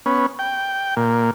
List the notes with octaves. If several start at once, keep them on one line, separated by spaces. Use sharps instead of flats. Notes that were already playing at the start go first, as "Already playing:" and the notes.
B3 C#4
G5
A#2